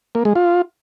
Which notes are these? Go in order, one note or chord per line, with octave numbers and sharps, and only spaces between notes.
A#3
G#3
F4